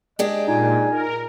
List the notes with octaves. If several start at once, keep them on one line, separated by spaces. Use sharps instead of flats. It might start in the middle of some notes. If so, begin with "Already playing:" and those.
G#3 D4 G4 D#5
A#2 D#4 F4 G#5
A#4